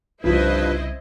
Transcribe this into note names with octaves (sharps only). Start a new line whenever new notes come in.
C2 G2 C#3 F3 E4 B4 C5 D#5